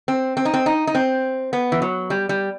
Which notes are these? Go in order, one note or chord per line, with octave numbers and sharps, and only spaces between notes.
C4
C4
D#4
C4
D#4
D#4
C4
B3
E3
F#3
G3
G3